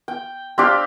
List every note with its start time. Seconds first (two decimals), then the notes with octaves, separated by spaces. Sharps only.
0.08 G5
0.58 C4 D4 G4 F5